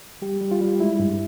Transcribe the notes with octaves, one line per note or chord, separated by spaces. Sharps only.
G3 G4
G3
F4
G3
G#3 E4
G2